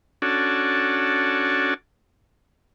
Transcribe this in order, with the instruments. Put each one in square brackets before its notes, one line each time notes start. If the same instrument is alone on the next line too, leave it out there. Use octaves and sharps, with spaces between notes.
[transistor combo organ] C#4 D4 F#4 A4